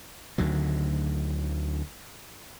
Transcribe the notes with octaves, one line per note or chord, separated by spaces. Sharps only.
D2 D3 D#3 F#3